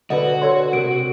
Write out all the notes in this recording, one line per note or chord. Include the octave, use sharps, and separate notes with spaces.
D3 F#4 B4 D#5
A4 C#5 C6
C3 G4 A#4 D7